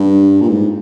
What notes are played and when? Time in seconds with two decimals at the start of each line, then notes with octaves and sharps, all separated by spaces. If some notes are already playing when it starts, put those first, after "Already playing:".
Already playing: G2
0.41 A#2
0.49 G#2